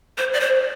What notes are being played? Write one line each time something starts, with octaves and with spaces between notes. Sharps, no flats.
C5
D5
C5